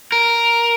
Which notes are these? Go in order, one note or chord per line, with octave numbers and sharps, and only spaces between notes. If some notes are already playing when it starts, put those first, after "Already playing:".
A#4